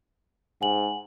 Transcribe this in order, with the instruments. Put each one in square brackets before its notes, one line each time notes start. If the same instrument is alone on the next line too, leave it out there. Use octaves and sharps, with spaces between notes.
[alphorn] G#2 [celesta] F#5 G#5 F#7